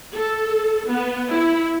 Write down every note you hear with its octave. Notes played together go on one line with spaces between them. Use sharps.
A4
B3
E4